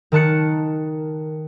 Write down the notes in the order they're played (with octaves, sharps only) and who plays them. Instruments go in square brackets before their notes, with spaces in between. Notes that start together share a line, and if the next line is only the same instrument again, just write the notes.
[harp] D#3 A#4 A5 F#6 C#7